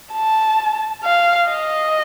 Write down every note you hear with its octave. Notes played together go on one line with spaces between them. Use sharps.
A5
F5
D#5